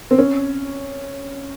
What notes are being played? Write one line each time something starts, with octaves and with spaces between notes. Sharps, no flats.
C4
C#4